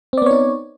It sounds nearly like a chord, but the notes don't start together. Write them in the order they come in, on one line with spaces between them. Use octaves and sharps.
C4 D5 B3 C#5 D#4